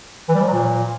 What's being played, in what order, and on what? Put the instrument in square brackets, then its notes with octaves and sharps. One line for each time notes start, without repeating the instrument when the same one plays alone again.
[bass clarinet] E3
G3
F3
F#3
A#2